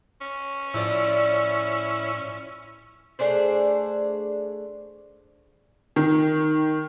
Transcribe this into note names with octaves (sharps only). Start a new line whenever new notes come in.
C#4
A2 F3 E4 D5
A3 D4 G#4 C5
D#3